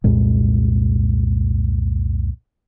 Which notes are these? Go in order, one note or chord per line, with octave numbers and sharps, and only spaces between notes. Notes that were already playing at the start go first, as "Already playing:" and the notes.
C2 F2 A#2 G#3